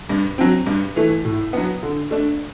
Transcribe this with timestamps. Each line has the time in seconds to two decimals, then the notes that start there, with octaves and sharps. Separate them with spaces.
0.09 G2
0.38 F#3 C4
0.66 G2
0.96 E3 A3
1.25 A2
1.53 F#3 B3
1.83 D3
2.11 A3 D4